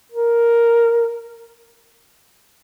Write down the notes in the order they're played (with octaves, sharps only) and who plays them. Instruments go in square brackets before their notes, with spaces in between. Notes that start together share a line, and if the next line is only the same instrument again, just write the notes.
[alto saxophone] A#4